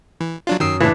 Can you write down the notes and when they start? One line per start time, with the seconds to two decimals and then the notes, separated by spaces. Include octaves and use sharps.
0.21 E3
0.47 F#3 D4 F4
0.60 F#2 D#3 D#6 E6 C7 D7
0.80 A2 C#3 E3 D4